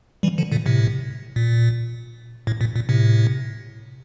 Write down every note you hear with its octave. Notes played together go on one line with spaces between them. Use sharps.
E3 G3
D3 F3
A#2 D3
A2 C3
A#2
A2
A#2
A#2
A2 C3